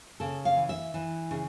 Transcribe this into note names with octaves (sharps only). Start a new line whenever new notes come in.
C#3 A4
F5
E3
E5
E3
C#3